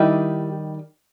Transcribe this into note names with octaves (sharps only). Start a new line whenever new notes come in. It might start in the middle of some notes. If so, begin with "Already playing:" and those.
Already playing: D#3 G3 D#4 E4 G4